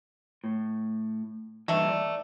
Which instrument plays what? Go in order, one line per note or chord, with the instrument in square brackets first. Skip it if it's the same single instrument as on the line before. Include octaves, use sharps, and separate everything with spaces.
[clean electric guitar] A2
[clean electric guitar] G2 E3 [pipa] D#3 A3
[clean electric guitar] D5